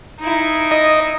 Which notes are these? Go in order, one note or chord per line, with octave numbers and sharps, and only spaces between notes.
D#4 E4
D#5